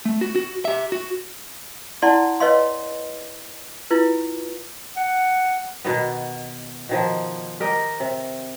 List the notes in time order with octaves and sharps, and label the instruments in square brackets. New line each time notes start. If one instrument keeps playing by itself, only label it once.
[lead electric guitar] A3
F#4
F#4
G4 E5
F#4
[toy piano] E4 D5 F#5 A5 C6
B4 C#5 D#5 F5 C6
E4 F4 B4
[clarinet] F#5
[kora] B2 D#3 B3
B2 D#3 F3
G4 A#4 D#5
C3